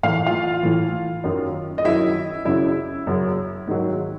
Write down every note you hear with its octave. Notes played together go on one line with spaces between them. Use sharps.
A2 E3 F5
F4 F5
A2 E3
F#2 D#3 F#3
D#5
F#2 D#3 F#3 E4 E5
F#2 C#3 F#3 E4 E5
F#2 C#3 F#3
G#2 D#3 F#3